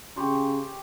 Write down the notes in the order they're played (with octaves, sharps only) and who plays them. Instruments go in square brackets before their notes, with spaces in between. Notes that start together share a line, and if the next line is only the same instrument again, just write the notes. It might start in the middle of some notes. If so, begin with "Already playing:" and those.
[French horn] C#3 [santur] G4 C6 C#6